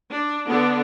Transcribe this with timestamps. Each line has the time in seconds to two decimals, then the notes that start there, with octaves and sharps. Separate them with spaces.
0.10 D4
0.48 D3 B3 D4